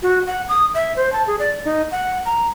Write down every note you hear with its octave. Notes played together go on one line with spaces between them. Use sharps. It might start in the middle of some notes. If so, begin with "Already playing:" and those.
F#4
F#5
D#6
E5
C5
A5
G#4
D5
D#4
F#5
A#5